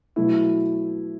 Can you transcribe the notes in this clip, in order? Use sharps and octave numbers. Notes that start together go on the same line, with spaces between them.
B2 F#3 A3 E4